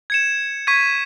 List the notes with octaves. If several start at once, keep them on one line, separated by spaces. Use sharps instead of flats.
G#6 C#7 E7
C#6 G#6 B6 D#7